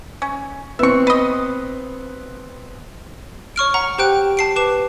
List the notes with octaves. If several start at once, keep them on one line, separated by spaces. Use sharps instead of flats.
C#4
B3 C4 E5 C#6
B4 D#5
C#5 C#6 F6 D7
F#5 A#5
G4 C5 G5 F#6 D7
A5 C7 D7
B4 D6 E7